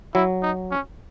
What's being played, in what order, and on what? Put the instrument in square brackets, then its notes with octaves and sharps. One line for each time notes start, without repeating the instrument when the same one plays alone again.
[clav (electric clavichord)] F#3 [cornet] E4
[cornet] D#4
C#4